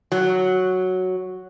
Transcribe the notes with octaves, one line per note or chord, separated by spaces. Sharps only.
F#3